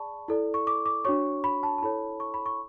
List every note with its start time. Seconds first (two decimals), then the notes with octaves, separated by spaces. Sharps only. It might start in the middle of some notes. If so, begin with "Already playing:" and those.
Already playing: G#4 D5 A5 B5 C#6
0.28 E4 A4 D5
0.54 C#6
0.67 D6
0.86 D6
1.05 D4 F#4 C#5 C#6
1.44 B5
1.63 A5
1.78 A5
1.82 E4 A4 C#5 B5
2.20 C#6
2.34 B5
2.46 C#6